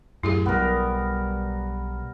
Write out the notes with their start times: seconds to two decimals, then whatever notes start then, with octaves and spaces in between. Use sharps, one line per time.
0.23 F#2 A2 E4 G4 G#4
0.46 B1 G3 B3 A#4